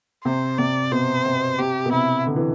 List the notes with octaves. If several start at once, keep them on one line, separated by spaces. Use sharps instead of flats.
C3 C5
C3 D5
B2 C5
C3
C3 G4
B2
C3 E4
D3
E3